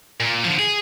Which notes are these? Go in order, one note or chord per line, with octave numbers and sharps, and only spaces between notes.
A#2
D3 F3
G#4